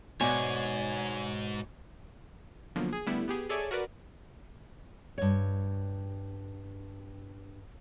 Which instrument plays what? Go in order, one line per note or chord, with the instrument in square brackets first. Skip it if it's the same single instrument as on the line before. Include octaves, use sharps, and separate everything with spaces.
[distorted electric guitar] G#2 [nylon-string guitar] B2 D5 [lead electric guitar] C#5 [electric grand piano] G#5
[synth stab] B2 D3 F3 F#3 A#3
G#4
D3 G3 A3 B3 E4
B3 G4 G#4
G#4 A4 C#5 D5 E5 G#5
F#4 A#4 B4 D5
[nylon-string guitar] G2 C#5